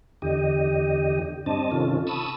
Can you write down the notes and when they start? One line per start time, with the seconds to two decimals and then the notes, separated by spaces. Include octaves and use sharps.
0.22 E2 D3 G4 D#5
1.46 G2 C4 D4 D#5 A5
1.72 C3 D#3 C#4 F4 A4
2.07 A5 B5 C#6 D#6 E6